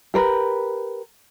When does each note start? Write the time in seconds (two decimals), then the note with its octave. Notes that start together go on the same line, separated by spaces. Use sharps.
0.14 G4 A#4 B4